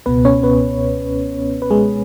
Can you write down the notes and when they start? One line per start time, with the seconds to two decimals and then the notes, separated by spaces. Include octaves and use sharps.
0.06 C#2 B2 B3 B4
0.25 C#4 C#5
0.43 B3 B4
1.62 B4
1.70 G#3 G#4